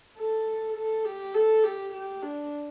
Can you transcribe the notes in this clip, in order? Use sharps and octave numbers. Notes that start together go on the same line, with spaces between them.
A4
A4
G4
A4
G4
G4
D4